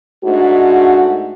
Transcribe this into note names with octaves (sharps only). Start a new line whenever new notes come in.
G#2 A3 D4 F#4